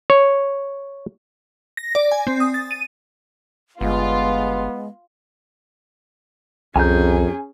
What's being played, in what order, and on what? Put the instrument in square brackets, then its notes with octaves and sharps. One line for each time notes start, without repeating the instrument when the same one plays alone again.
[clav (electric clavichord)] C#5
[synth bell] A#6
D5
G#5
C4
D#6
A6
D#7
[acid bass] G1 [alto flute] G#3 [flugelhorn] B3 [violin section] F4
[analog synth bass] C2 [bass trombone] F2 [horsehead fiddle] C#4 G#4 [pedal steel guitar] G#5 A#5 G6